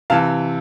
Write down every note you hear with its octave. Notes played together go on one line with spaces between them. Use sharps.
C3 E3 F5 A5